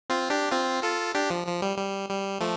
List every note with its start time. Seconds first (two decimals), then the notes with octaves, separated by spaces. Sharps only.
0.10 C4 F4
0.30 D4 G4
0.51 C4 F4
0.83 F4 A4
1.15 D4 G4
1.30 F3
1.47 F3
1.62 G3
1.78 G3
2.09 G3
2.40 F3 A3